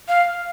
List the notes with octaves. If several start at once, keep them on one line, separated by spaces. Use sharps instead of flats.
F5